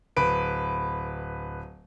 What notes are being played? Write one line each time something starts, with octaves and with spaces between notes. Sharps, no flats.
D1 B4 D7